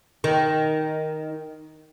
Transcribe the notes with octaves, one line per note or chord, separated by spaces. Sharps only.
D#3